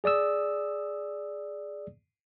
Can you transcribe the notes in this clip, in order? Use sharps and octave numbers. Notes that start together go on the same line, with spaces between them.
G#4 D5 D#6 E6